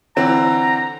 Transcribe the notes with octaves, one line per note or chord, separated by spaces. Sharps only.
D3 E3 C4 A#5